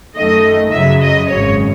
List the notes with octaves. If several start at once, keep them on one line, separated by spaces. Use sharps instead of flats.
F#2 D#3 A3 D#5
F#2 C#3 F#3 E5
D#5
G#1 F#2 C#3 C#5